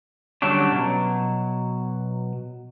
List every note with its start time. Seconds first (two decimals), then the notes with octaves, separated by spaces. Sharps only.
0.42 D3 F#3 G3 A3 C#4 D4
0.72 B2 F#3